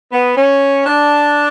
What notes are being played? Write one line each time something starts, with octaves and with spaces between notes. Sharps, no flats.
B3
C#4
D4